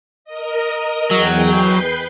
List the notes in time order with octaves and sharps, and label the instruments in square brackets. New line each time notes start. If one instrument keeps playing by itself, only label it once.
[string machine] A#4 D#5
[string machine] E2 G#4 G5 [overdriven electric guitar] F#3
[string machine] B4 G6 C7